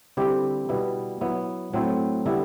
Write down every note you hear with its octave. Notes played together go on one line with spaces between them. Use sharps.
D3 G3 C4 E4 G4
B2 G3 B3 E4
F#3 B3 E4
A2 F#3 C4 E4
D3 G3 B3 E4